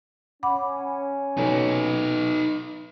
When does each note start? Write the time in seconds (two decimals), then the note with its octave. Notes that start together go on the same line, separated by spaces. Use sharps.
0.43 C#4 F#5 B5 D6
1.37 B2 F#3 A3 D#4 B4